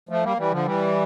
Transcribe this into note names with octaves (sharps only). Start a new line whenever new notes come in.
F3 A3
G3 A#3
E3 G3
D3 F3
E3 G3